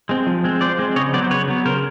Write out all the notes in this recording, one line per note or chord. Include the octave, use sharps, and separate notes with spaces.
G#3 C4
F3
G#3 C4
F3 C5 D5
G#3 C4
C#3 C#5 D#5
F#3 B3 C5 D5
C5
C#3 B4 C#5
F#3 B3
C#3 A#4 C5